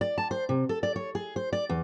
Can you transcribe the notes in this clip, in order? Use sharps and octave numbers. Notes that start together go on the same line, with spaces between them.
D5
A5
C5
C3
A4
D5
C#5
G#4
C5
D5
E2